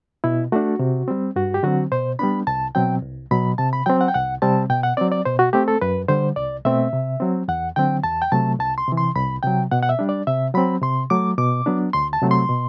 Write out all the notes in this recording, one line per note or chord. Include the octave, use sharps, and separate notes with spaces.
B2 E4
A3 D4 F#4
C3
G3 C4
G2 F#4
G4
D3 F#3 C4 F#4
B2 C5
G3 B3 D4 B5
C2 A5
B2 F#3 C4 G5
C2
B2 F#3 B5
C3 A5
B5
F#3 C4 G5
F#5
G5
C2 F#5
C3 G3 C4 A5
B2 G5
F#5
F#3 C4 D5
D5
B2 C5
F#4
A3 C4 G4
A4
F#2 B4
D3 G3 C5
C2 D5
B2 A3 C4 E5
C3
F#3 C4
E2 F#5
D3 F#3 C4 G5
E2 A5
G5
C3 F#3 A3 A5
C2 A5
C6
C3 E3
C6
C2 B5
C3 F#3 G5
B2 F#5
F#5
E5
G3 D4
D5
C3 E5
F#3 C4 B5
C3 C6
F#3 A3 D6
B2 D6
F#3 B3 D4
D2 C6
A5
C3 F#3 A3 C4
C6
B2